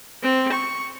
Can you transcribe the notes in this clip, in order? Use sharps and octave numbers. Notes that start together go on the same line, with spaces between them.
C4
C#6